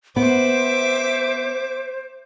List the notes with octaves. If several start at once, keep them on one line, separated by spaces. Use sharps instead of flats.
B3 B4 C5 E5 D6